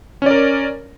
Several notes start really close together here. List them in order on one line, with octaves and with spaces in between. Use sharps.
C#4 D5 A#4